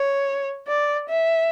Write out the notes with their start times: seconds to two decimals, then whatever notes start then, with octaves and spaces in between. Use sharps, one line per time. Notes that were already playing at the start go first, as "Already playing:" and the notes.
Already playing: C#5
0.68 D5
1.09 E5